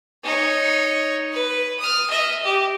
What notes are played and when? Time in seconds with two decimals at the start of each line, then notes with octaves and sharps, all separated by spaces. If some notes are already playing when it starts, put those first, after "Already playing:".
0.24 D#4 C#5
1.32 B4
1.79 D#6 F6
2.10 D#5 E5
2.44 G4